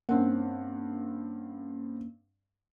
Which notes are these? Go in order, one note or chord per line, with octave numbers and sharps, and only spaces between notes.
G2 A#3 C4 C#4 F#5